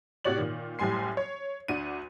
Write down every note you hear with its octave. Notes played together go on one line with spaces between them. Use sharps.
A2 C3 F#4 C#5 D5 F#7
A#2 D#3
F#1 A2 G3 G#5 C6 C7
C#5
D2 D4 F#5 D#7